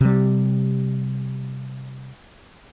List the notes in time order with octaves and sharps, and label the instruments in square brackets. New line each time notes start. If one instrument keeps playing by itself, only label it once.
[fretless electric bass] C3 G3